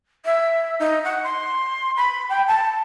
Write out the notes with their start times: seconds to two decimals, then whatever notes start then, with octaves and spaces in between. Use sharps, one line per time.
0.25 E5
0.79 D#4
1.04 F#5
1.23 C6
1.96 B5
2.29 G5
2.47 A5